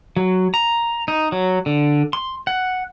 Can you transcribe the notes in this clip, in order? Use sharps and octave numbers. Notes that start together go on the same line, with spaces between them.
F#3
A#5
D#4
F#3
D3
C6
F#5